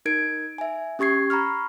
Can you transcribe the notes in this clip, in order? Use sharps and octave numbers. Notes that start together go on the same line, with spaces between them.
D#4 A#4 G#6 D7
E5 G#5
C#4 G4 C#6 G#6 C7
A#5 B5 C#6 F6